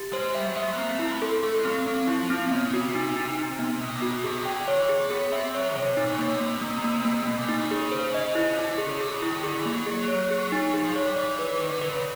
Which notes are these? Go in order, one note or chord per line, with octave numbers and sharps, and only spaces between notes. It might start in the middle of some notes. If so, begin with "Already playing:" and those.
Already playing: G4
G#3 C5
G3 E5
F#3
G#3 E5
A3
B3
A#3 C4
A3
A#3 E4
B3
C4 A4
A3 A4
G#3
F#3 C4
F#3
C4
F#3
F3 E4
C4
C#3 B3
C#3
F#4
C3
D#4
D#4
D#4
B3
B2 B3
C3
F#4
B2
C3 G#4
C#3
D3 G5
D#3 C#5
E3
G#4
A#3
B3 G#4
C4 E5
F#3 C#5
C3 C#5
A#2 D#4
A#2
B2
A#3
C3
A#3
A#3
A#3
A#3
B2 A#3
A#2
C3 D#4
C#3
G#4
C5
D#5
E4
D3 E4
D3
G#4
C#3
D3 G#4
C#3
D#3 E4
D#3
D3 G#4
E3
A#3
F#3
G#4
C#5
G#4
D#4
F3 G#4
F3
F#3 C#5
G3
E3 D5
B4
D#3 B4
D3
D3 B4
C#3